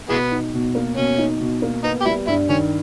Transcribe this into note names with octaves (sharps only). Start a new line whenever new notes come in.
B2 E3 G#3 B3
D#4
B2
A#3
B2 C#4
D#4
B2
A#3
B3 D#4
G4
G3 E4
G2 E4
D#3 C#4